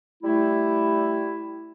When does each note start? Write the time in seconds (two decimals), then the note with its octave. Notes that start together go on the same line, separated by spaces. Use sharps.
0.23 G3 A3 E4